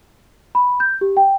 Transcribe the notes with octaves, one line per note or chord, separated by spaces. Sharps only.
B5
G6
G4
G5